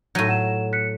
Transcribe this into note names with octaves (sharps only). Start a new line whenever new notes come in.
A2 F#3 G6 A#6 D#7
F#5 E7
F#6 B6 C#7